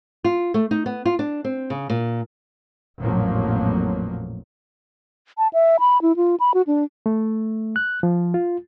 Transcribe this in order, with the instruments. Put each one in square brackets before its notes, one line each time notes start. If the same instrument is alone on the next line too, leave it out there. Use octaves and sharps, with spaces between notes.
[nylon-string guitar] F4
A3
D#4
B3
F4
D4
C4
C#3
A#2
[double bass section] A1 F2 A#2 F3 F#3 A#3
[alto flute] A5
E5
B5
E4
F4
B5
F#4
D4
[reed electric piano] A3
F#6
F3
F4